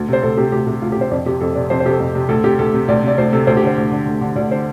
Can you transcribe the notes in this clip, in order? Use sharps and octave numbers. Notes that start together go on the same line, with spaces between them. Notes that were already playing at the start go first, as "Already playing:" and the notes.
Already playing: D2
C3 C5
D2 A4
C3 G4
D2 G4
C3 G4
D2 F4
G4
C3 C5
F2 D5
C3 G4
F2 A4
C3 D5
F2 C5
C5
C3 G4 A4
F2
C3
D2 A4
C3 G4
D2 A4
C3
D2 D5
C3 D5
D2 C5
C3 A4
D2 C5
G4
D3
C5
D2
D3
D2
D3
D2 D5
D3 C5